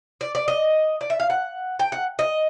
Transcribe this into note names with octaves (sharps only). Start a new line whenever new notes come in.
D5
D5
D#5
D5
E5
F5
F#5
G5
F#5
D#5